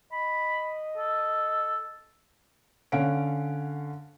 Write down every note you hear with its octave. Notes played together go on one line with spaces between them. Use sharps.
D#5 B5
A4
D3 C#4 F5 F#5 D7